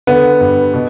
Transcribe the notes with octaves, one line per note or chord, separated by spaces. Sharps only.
D3 B3
G2
B2